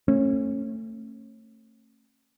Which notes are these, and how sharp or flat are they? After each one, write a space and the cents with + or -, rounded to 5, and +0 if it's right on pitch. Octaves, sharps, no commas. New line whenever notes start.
A3 +25 C#4 -30